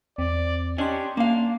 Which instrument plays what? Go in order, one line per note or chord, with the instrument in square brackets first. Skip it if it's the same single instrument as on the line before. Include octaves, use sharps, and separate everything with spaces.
[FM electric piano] E2 C4 [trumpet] D5
[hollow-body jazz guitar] C#4 D4 [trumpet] G4 [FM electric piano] D#5 C6
[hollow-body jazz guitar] A#3 F5 [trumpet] D4